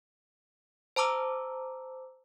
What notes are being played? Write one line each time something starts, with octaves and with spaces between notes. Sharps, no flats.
C5 A5 A#5 D6 E6